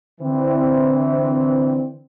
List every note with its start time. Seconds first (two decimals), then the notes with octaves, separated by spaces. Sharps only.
0.21 D3 E3 C4